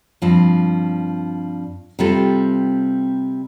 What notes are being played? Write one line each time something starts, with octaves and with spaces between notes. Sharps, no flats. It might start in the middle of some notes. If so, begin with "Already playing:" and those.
G2 F3 C4
C3 G3 C4 F4 A4